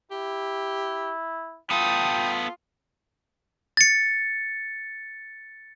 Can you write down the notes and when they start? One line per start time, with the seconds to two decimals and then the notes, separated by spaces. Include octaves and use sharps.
0.11 E4 G4
1.71 B3 F4 A4 G5 D#6
3.77 A6 C#7